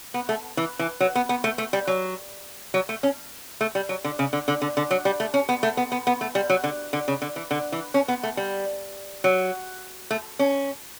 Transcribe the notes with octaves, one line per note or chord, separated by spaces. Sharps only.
B3
A3
E3
E3
F#3
B3
B3
A3
A3
G3
F#3
F#3
A3
C#4
A3
G3
F#3
D3
C#3
D3
D3
D3
D3
F#3
G3
A3
C#4
B3
A3
B3
B3
B3
A3
G3
F#3
D3
D3
C#3
D3
E3
D3
E3
C#4
B3
A3
G3
F#3
A3
C#4